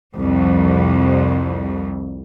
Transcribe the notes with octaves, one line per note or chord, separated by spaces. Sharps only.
C2 F2